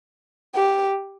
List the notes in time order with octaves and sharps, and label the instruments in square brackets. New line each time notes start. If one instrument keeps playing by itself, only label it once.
[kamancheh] G4